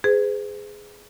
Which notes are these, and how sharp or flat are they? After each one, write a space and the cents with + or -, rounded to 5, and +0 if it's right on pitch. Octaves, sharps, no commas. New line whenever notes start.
G#4 +0 B4 +45